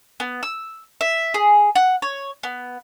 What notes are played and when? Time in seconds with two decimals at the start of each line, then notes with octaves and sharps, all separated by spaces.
0.20 B3
0.43 E6
1.01 E5
1.34 G#4
1.76 F#5
2.02 C#5
2.43 B3